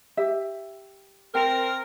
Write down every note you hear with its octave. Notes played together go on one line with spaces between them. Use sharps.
G4 E5
C4 A#4 G5